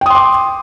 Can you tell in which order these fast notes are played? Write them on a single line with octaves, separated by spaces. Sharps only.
G5 D#6 C6 D6